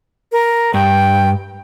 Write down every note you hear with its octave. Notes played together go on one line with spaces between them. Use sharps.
A#4
G2 G5